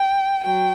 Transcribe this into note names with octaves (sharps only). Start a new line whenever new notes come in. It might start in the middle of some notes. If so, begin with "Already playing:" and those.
Already playing: G5
F#3 G5